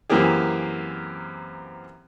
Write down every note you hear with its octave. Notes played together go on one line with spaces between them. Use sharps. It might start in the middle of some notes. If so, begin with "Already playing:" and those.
F#2 E3 A#3 C4 G4 G#4